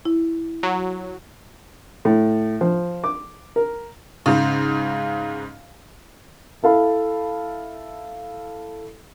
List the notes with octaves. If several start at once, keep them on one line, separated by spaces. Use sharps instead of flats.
E4
F#3
A2
F3
D6
A#4
G#2 C#3
E4 A4 F5 B5